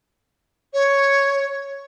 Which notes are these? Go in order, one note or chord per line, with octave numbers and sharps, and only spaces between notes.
C#5